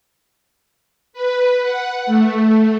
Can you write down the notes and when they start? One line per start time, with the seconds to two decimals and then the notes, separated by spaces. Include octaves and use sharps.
1.13 B4
1.62 F#5
2.06 A3